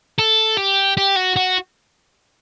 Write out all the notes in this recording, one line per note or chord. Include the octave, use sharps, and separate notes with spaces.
A4
G4
G4
F#4
F#4